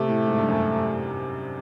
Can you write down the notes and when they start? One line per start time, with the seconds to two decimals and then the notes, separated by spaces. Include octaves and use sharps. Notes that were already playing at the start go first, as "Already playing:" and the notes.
Already playing: C3 A3
0.08 A2
0.28 G#2
0.38 G2
0.49 F#2